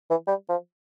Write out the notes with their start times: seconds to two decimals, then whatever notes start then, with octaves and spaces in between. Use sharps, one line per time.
0.11 E3
0.27 G3
0.49 F3